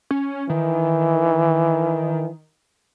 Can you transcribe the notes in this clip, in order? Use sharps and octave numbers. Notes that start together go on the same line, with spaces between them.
C#4
D#3 E3